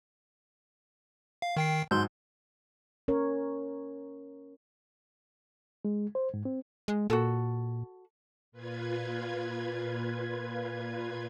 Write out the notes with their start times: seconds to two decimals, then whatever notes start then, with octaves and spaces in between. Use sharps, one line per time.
1.42 F5
1.57 D#3 G5 C7
1.91 G#2 F#3 C6 E6 G6
3.08 C#4 A#4 C#5
5.85 G#3
6.15 C5
6.34 G#2
6.45 C4
6.88 G#3
7.10 A#2 F#4 A4
8.52 A#2 F4 B4 G#6